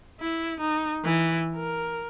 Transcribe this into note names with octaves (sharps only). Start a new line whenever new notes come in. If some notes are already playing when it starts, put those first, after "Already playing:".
E4
D#4
E3
A#4